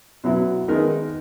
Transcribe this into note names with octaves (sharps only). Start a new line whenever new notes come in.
B2 F#3 B3 E4
D#3 G#3 B3 D#4 A#4